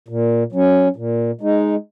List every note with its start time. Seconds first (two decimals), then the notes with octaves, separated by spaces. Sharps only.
0.08 A#2
0.52 F#3 C#4
0.96 A#2
1.41 G#3 D#4